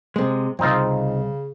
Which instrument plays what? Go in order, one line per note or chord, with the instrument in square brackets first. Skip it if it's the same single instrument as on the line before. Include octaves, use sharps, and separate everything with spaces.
[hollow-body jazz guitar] C3 G#3
[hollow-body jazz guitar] C2 F2 [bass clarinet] C#3 [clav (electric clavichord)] C4 D#4 F4